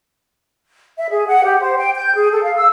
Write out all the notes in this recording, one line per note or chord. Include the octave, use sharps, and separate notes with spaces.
E5
G#4
F#5
G4
C5
G5
G6
G#4
A4
F5
E6